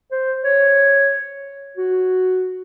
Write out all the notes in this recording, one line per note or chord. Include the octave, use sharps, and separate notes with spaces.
C5
C#5
F#4